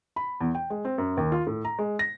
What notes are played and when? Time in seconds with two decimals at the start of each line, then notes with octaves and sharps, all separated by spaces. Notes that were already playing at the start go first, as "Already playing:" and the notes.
0.16 B5
0.41 E2
0.55 G5
0.70 G#3
0.85 C4
0.98 F#2
1.17 D#2
1.32 F4
1.47 A2
1.65 A#5
1.79 G#3
1.99 A#6